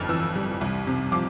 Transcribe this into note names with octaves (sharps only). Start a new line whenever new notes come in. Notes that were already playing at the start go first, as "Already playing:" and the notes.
Already playing: G1 F2 F6 A6
E3 E6
G3
C2
C3
F3 D6